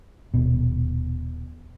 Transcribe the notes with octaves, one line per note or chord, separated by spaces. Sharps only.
D#1 B2